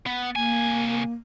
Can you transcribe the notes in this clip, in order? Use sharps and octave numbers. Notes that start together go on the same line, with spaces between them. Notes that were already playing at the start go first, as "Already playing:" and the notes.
B3
C2 A#3 G#5